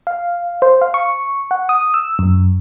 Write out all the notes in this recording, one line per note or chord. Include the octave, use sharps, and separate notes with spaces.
F5
C5
F5
C#6
F#5
D#6
E6
F#2